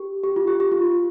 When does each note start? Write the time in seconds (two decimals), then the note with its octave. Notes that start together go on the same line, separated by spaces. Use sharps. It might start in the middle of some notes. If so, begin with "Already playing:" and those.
Already playing: G4
0.24 G4
0.36 F4
0.48 G4
0.60 G4
0.72 F4
0.84 F4